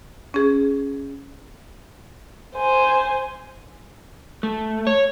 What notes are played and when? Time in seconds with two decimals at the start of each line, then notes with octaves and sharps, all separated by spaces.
0.34 C#4 G#4
2.55 C5 G#5
4.43 A3
4.87 C#5